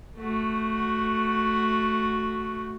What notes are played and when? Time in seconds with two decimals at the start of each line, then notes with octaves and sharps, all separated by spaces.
0.17 A3 F#4